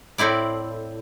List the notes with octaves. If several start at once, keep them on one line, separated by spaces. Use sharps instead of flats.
A2 C4 E4 D5